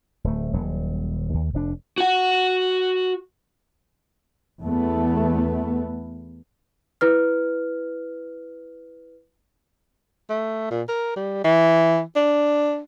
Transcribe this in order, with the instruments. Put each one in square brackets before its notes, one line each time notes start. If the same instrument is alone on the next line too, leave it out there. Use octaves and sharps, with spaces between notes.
[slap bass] D1 A3
D#1 F#3
D#2
F1 D4
[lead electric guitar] F#4 F#5
[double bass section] E2 A3 B3
[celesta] E4 B4 F6
[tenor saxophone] A3
A#2
A#4
G3
E3
D4